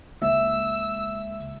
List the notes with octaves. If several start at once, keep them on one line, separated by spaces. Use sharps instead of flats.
C#2 G#3 A#3 E5 E6